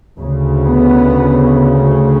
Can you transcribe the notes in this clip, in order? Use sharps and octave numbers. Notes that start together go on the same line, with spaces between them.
D2 C#3
B3